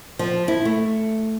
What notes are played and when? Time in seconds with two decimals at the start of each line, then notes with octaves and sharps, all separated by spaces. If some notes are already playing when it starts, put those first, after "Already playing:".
0.19 F3
0.48 E4
0.65 A3